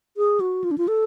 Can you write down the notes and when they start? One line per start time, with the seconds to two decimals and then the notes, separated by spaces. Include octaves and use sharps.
0.17 G#4
0.40 F#4
0.64 F4
0.71 D4
0.78 F4
0.88 A4